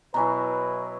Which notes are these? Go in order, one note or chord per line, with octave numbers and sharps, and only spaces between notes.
B2 F#3 E4 B4 G#5 A#5